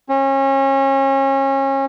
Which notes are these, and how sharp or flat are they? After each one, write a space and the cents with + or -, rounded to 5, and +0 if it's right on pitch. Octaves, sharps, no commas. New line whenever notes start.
C#4 -30